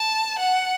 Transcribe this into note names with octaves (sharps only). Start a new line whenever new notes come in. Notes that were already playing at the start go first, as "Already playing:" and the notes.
Already playing: A5
F#5